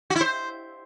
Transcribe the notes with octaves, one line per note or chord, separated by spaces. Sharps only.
F#4
E4
C5